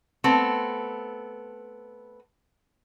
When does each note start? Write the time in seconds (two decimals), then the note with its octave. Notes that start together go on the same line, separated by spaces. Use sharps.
0.24 A3 B3 C4